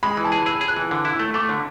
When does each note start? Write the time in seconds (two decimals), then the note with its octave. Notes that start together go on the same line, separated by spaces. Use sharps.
0.03 G#3 B5
0.17 E3
0.25 A5
0.32 G#4
0.46 G#4 E6
0.61 G#4
0.68 F#6
0.76 E3
0.91 D3 E6
1.05 E4
1.13 E6
1.19 A3
1.34 A3 D6
1.49 D3